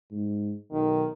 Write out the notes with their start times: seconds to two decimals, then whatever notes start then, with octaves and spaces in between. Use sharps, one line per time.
0.11 G#2
0.72 B1 D#3